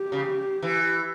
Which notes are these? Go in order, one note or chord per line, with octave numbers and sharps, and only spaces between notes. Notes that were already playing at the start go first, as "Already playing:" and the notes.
Already playing: G4
C#3
E3